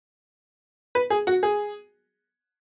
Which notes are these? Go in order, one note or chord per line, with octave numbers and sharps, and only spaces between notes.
B4
G#4
F#4
G#4